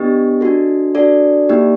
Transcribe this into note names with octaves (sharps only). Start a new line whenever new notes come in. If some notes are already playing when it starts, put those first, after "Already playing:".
Already playing: B3 D4 G4 D#5
D4 F#4 A4
D4 F#4 A4 D5
A#3 D#4 G4